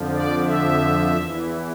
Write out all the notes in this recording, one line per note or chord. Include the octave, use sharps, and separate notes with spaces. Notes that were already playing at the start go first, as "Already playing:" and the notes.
Already playing: F2 D3 F3
D5
E5
E2 E3